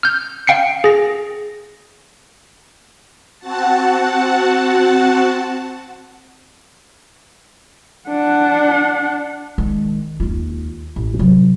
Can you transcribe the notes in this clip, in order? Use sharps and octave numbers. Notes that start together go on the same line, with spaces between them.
F6 G6
F5 G5 C7 C#7
G#4 A#6
C4 F#4 F#5 A5
D4 F#5
D#3 G#3
D#2 F4
A1
C3 F#3